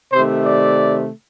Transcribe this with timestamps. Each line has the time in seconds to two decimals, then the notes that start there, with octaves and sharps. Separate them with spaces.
0.13 C3 D#3 A3 C5
0.47 D5